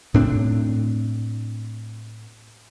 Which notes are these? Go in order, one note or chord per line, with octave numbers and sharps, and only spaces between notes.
A2 C4 D4